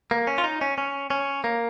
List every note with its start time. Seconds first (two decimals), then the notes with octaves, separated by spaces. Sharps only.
0.11 A#3
0.27 C#4
0.38 F4
0.44 D#4
0.61 C#4
0.78 C#4
1.10 C#4
1.44 A#3